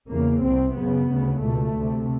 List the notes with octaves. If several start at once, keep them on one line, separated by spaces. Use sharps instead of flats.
E2 C#3 A#3
C2 C3 C4
F#2 C#3 B3
D2 C#3
C#2 B2 A3
D2 C3